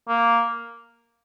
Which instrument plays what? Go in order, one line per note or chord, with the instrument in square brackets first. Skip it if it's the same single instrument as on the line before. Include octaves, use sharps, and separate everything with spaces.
[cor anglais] A#3